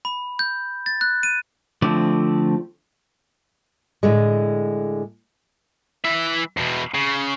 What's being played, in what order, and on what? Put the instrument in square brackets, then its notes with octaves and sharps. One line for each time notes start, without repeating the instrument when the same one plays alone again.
[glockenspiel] B5
G6
A6
F#6
D#7
[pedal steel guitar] D3 F3 A3 C4 D5
[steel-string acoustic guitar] A2 D3 G#3
[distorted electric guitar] E3 E5
E2 B2
C#3